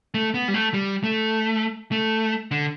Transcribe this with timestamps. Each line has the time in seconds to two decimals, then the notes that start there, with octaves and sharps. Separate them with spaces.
0.14 A3
0.34 B3
0.48 G3
0.54 A3
0.74 G3
1.04 A3
1.92 A3
2.51 D3